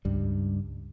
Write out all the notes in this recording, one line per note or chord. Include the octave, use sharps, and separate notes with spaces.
C#2 G2 G3